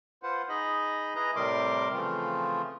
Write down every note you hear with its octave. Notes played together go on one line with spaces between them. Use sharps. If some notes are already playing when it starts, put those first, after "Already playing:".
F4 B4 C5 F#5
D#4 G#4 D#5 B5
E4 G#4 B4 D#5 A#5
A2 C3 G3 A#4 C6 D6
C#3 E3 F3 A3 C4 F4